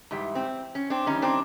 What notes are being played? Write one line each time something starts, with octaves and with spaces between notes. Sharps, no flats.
G#2 E3 G3
C4
C#4
C4 D4
F#2 D#3 G3 C#4 D#4
C4 D4